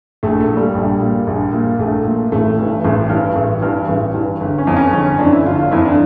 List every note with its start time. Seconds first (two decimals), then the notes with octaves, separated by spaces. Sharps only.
0.23 A#1 A3
0.40 A3
0.48 A#2
0.57 G3
0.74 A#1
1.01 A#2
1.27 A#1
1.53 A#2
1.79 A#1 A3
2.05 A#2
2.32 A1 A3
2.58 G2 E3
2.85 A1
3.10 G2 E3
3.36 A1
3.62 G2 E3
3.89 A1
4.14 G2 E3
4.41 G1
4.58 C#4
4.67 F2 E3
4.76 C#4
4.93 G1 C#4
5.06 C#4
5.19 F2 E3 D4
5.32 E4
5.45 G1 F4
5.58 F4
5.71 F2 E3 E4
5.85 D4